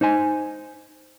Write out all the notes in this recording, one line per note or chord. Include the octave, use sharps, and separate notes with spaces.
D#4 C5 G#5